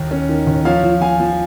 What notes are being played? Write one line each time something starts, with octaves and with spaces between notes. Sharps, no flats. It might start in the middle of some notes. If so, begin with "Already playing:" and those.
Already playing: D#2
C#4
D#3
D#2
F3 C#5 F5
F3
F3 F5 G#5
F3